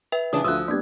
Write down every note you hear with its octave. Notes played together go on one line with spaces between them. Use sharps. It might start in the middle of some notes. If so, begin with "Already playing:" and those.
B4 E5 G5
C#3 E3 D4 D#6
D2 F3 F4 D#6 E6 F#6
G3 A#3 B3 D4 G#6